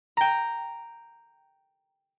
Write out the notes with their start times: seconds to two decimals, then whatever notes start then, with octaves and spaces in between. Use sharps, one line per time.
0.17 G5 A#5